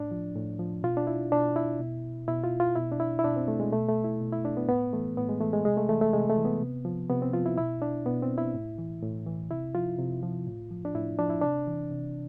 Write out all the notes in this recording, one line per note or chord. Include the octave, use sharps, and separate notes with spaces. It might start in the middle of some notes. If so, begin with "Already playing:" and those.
Already playing: A2 D4
F3
A2
F3
B2 F4
D4
E4
B2 D4
E4
B2
B2 E4
F4
F4
B2 E4
D4
E4
E4
B2 D4
C4
A3
G#3
B2 A3
A3
E4
B2
E4
D4
B3
A2 B3
E3 A3
A2 B3
G#3
E3 A3
G#3
C3 G#3
A3
E3 A3
A3
C3 G#3
A3
E3
B3
C3
F3
C3 B3
C4
F3 F4
E4
B2 E4
D4
B2 B3
C4
E4
A2
E3
A2
E3
C3 E4
F3 F4
C3
F3
A2
F3
D4
A2 E4
F3 D4
E4
C3 D4
E3
C3